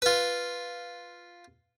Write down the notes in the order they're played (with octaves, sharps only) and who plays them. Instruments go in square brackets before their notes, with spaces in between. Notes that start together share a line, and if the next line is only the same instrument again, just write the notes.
[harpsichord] F4 B4